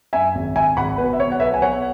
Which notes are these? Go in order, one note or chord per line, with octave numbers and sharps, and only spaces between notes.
F#2 E5 G#5
G#1
G#1 E5 G#5
G#1 F#5 B5
B2 B4
E5
B2 C#5
F#5
B1 B4 E5
G#5
B2 C#5 F#5